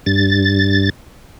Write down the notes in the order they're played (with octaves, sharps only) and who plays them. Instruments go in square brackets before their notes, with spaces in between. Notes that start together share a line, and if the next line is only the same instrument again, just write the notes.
[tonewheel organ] G2 A6